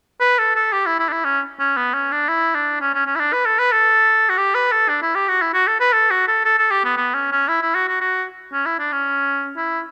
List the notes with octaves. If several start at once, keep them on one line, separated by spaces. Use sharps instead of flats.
B4
A4
A4
G4
E4
E4
D4
E4
C#4
C#4
B3
C#4
D4
E4
D4
C#4
C#4
C#4
E4
D4
B4
A4
B4
A4
F#4
G4
B4
A4
D4
E4
G4
F#4
E4
F#4
A4
B4
A4
F#4
A4
A4
A4
G4
B3
B3
C#4
C#4
E4
E4
F#4
F#4
F#4
C#4
E4
D4
C#4
E4